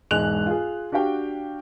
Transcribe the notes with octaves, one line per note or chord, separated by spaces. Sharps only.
E1 G#2 G#3 F#6 F7
F4 G#4
D4 F#4 G4 F5 G5